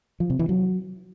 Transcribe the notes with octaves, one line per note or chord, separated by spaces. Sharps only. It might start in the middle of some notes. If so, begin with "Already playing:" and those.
F3
C3
E3
F#3